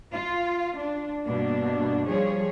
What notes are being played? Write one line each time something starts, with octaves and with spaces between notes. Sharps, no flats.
F4
D4
G2 B2 A#3 D4
F3 G3 G#4 C#5